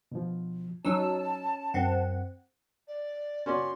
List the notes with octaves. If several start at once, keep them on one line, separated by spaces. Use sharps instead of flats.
B2 F3
F#3 C#4 D#4 A5 E6
F#2 C4 F#5
D5
C#4 F#4 D5 C6